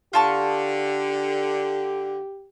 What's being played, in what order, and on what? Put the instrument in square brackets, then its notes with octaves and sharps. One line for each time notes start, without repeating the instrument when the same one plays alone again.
[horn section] D3 [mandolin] F4 A5 C#6 [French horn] G4